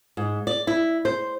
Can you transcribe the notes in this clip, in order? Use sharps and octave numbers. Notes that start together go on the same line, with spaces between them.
G#2
D5
E4
C5